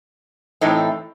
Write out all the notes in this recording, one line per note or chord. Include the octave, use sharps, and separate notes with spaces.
A2 E3 C4 D#4 A4